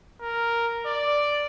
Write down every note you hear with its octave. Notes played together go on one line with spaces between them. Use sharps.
A#4
D5